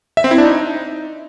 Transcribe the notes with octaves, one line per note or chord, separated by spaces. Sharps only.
E5
C4
E4
D4
D#4